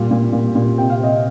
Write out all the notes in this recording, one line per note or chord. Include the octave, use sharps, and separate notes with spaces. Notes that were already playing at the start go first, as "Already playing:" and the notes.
Already playing: A#2 G3
A#2
A#2
A#2
C3 G5
F5
C3 D#5